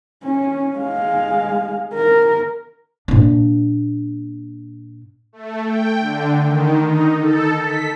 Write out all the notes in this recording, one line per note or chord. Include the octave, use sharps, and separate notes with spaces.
C#4
G#3 F5
A#4
A#2 D4
A3
G5
D3
D#3
D#4
A4
B6